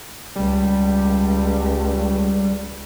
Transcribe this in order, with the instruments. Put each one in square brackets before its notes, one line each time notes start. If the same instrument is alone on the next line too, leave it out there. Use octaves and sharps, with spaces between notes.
[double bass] C#2 [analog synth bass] G3